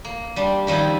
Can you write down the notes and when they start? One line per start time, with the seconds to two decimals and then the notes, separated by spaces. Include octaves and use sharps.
0.05 A#3
0.36 G3 D4 C6
0.67 D#3 F3 G3 D#4 E4